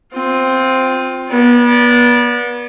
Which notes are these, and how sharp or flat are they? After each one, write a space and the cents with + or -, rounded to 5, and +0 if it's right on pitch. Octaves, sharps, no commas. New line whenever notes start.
C4 +0 F4 +20
B3 -35 D5 -15